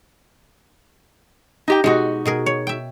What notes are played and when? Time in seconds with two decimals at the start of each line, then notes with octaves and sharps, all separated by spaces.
1.68 D#4 G4 G5
1.84 B2 G#3 D#4 F#4
2.26 B2 G#4 A#4
2.46 C#5
2.67 E5 G5